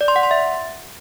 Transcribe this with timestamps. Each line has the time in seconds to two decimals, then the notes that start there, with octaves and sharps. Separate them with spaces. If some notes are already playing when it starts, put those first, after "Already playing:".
0.01 D5
0.08 C6
0.16 F#5
0.23 C6
0.31 E5